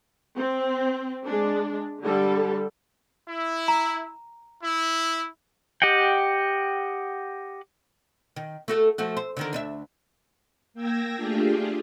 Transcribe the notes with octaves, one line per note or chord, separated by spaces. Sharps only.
C4
G#3 D4
D3 G3 A4
E4
A#5
E4
G4 D#5 F#5 G5
D#3
A3 F#4 A4
F3 A3 F#4
C5
D3 D#3 A#4
D2 D4 E5
A#3 G5 E6 G#6 A#6
A3 D4 F4 G4 G#4